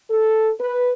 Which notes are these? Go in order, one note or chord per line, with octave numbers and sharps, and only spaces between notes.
A4
B4